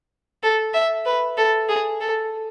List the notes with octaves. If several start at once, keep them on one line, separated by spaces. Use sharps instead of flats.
A4
E5
B4
A4
G#4
A4